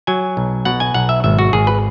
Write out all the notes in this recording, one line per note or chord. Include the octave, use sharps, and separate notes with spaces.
F#3 G#5
B1
B2 F#5
G#5
B1 F#5
E5
G#1 E5
F#4
G#1 G#4
B4